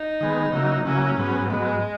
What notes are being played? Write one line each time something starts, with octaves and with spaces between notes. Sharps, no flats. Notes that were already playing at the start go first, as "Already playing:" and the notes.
Already playing: D#4
D#3 G#3 B3
C#3 F#3 A#3 E4
C#3 F#3 A#3 C#4 E4
G#2 F#3 B3
G#2 F#3 G#3 B3